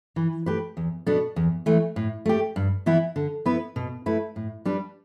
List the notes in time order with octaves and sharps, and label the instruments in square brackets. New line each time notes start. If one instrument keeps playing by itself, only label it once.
[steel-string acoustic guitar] E3
A3 G4 B4
E2
B2 B3 D4 A4
E2
E3 A3
A2
A3 G4
G2
E3 B3 E4
D3
B3 E4 B4
B2
A3 E4 B4
A2
G3 D4 B4